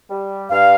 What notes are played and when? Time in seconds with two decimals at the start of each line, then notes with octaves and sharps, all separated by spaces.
0.10 G3
0.50 G2 F5